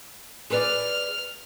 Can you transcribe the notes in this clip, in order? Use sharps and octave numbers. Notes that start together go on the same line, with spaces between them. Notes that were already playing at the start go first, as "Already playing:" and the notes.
G#4 B4 D5 F6